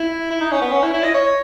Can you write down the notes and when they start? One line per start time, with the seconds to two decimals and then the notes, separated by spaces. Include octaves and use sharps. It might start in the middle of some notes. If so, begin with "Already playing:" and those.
Already playing: E4
0.31 E4
0.41 D#4
0.52 C#4
0.62 B3
0.72 C#4
0.83 E4
0.94 E4
1.04 D#5
1.14 C#5